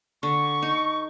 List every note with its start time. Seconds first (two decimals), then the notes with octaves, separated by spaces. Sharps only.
0.23 D3 C#6
0.62 D#4